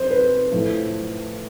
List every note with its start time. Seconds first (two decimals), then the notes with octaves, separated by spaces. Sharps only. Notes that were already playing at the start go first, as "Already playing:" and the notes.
Already playing: C3 C5
0.11 B4
0.52 A2 F3 A3